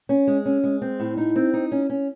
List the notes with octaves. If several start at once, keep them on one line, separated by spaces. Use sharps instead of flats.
C#4
G#3
C#4
G#3
C4
A2
D#4
C4
D#4
C#4
C#4